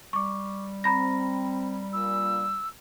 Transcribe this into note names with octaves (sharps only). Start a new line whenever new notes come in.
G3 C#6 D6
C4 A#5 B5 A#6
G2 A#2 E6